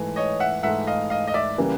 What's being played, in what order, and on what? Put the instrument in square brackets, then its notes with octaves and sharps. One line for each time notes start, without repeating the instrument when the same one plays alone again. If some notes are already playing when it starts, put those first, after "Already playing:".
Already playing: [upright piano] G#2 E3 A3
[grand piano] C#5 D#5
E5 F#5
[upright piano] G#2 E3 A3 [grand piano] E5 F#5
[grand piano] D#5 F5
D#5 F5
D#5
D5 E5
[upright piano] C#3 E3 G3 A#3